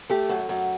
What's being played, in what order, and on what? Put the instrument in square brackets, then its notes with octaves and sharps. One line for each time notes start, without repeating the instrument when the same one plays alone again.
[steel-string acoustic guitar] A3 [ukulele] G4
[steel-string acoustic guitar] F#2
F#2